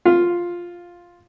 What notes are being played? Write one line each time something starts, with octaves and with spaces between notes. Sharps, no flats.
F4 F5